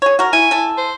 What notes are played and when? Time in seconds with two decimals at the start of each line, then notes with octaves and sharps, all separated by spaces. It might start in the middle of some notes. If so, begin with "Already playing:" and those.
0.02 G#4 C#5
0.19 F#4 A#4
0.33 E4 G#5
0.51 E4 A4
0.78 C5